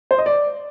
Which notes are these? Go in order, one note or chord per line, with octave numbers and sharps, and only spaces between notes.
C5
D#5
D5